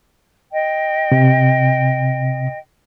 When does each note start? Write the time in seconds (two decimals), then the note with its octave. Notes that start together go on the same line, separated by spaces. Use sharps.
0.51 D#5 G5
1.12 C3